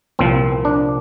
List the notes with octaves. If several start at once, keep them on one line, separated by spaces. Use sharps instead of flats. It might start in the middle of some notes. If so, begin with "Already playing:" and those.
C2 A#2 F3 C4
D4